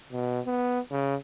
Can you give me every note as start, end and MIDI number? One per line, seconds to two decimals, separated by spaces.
0.12 0.40 47
0.46 0.80 59
0.91 1.16 49